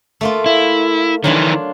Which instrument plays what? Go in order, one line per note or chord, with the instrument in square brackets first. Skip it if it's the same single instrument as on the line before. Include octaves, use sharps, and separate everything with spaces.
[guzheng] A3 A#3 F4
[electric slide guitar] E4
[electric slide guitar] D#3 E3 [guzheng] F#3 D4 F4